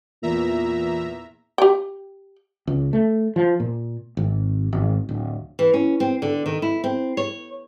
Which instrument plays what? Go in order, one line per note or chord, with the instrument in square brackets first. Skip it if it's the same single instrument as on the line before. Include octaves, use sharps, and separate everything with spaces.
[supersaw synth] E2 E5 A#5 [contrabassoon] A#2
[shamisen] G4 G5
[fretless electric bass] C#2
A3
F3
A#2
G#1
G#1
D1
[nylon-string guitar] E3
C#4
C4
D3
D#3
E4
C4
C#5